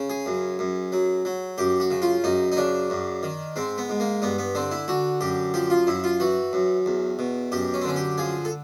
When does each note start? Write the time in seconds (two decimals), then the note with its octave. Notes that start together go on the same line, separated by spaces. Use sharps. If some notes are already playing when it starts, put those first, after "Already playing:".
Already playing: C#3
0.10 G#4
0.26 F#2
0.59 F#2
0.92 F#3
1.25 F#3
1.58 F#2 G4
1.80 F#4
1.91 C#3
2.02 F4
2.24 F#2 D#4
2.52 D#4
2.57 C#3 D4
2.90 F#2
3.23 D#3
3.56 G#2 C4
3.78 B3
3.89 G#2
4.00 A#3
4.22 G2 B3
4.38 B3
4.55 D3 C4
4.71 E4
4.88 D3 F#4
5.21 F#2 G4
5.54 F3 G4
5.70 F4
5.87 F#2 E4
6.04 F4
6.20 E3 F#4
6.53 F#2
6.86 E2
7.19 B2
7.52 F#2 G4
7.74 C#4
7.81 C4
7.85 D3 C#4
7.96 G4
8.18 F3 G#4
8.45 A4